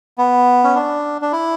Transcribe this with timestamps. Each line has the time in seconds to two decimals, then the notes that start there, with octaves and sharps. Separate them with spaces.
0.18 B3
0.64 C#4
0.76 D4
1.21 D4
1.32 E4